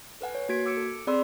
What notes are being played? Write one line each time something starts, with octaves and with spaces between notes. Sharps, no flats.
A4 B4 F#5 G#5
C#5
A#3 F#4 G#6 B6 D7
D6 E6 C#7 D7
A4
C4 G#4 D5 B5 C6 E6